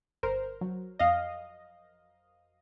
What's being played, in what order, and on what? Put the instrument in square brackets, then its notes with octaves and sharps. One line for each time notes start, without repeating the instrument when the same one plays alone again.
[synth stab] G1 A#4 C5
F#3
F2 D#5 F5